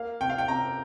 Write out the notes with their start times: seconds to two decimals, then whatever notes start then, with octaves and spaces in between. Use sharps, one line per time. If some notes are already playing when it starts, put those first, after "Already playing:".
Already playing: A#3 F5
0.21 C3 G5
0.30 F5
0.38 G5
0.48 C3 A#5